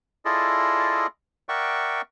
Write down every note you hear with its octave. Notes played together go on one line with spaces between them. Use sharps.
E4 F4 G#4 A4 D5 D#5
A#4 D5 E5 F#5 G5 C#6